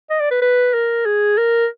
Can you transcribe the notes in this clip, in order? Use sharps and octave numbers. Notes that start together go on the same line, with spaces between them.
D#5
D5
B4
B4
A#4
G#4
A#4